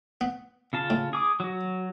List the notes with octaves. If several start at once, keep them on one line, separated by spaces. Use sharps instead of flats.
B3
C#3 F4 A5
A2
G#4 D6 D#6
F#3 F#4